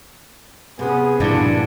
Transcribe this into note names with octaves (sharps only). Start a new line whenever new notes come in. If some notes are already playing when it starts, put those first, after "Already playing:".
C3 B3 C#4 G#4
G2 A#2 D3 F3 D4 E4 F#4